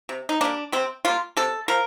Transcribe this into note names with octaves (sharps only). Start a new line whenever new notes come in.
C3
D#4
G3 A#3 D4
C3 C4
G3 A#3 F4
C3 A4
F3 A#4